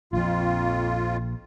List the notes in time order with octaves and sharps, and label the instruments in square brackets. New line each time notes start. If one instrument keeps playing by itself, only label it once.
[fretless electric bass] A#1 F3 [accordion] F2 F4